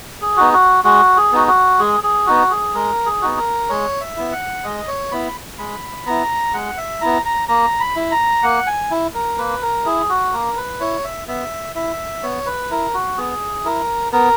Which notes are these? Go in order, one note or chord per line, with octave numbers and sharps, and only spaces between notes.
G#4
B3 D#4 F#4
F#4
G#3 F#4
G#4
B3 D#4 F#4
F#4
G#3 G#4
G#4
B3 D#4 F#4
G#4
G#3 A#4
G#4
B3 D#4 F#4
A#4
G#3 C#5
E5
B3 E4
F#5
G#3 D#5
C#5
B3 E4 B5
G#3 B5
B3 E4 A#5
G#3 F#5
E5
B3 E4 A#5
A#5
A#3 A#5
B5
E4
A#5
A#3 F#5
G#5
E4
A#4
A#3 B4
A#4
E4 G#4
F#4
A#3 A#4
B4
E4 C#5
E5
B3 E5
E4 E5
B3 C#5
B4
E4 A#4
F#4
B3 G#4
E4 A#4
B3 A#4